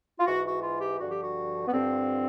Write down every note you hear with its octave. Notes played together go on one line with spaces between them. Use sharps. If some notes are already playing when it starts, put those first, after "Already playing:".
F4
G#2 E3 F#4
F#4
F4
G4
G2 D3 F3 F#4
G4
F#4
B3
G2 D3 F3 C4